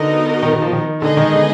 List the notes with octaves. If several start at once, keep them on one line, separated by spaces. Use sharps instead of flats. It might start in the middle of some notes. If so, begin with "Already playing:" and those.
Already playing: D3 B3 D#4 F#4 A#4 D#5
D#3
D#3
F3
D#3
D3 G#3 B3 D#4 G#4 D#5
D#3
D3